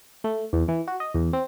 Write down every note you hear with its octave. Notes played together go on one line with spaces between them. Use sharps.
A3
E2
E3
F#4
D#5
E2
C4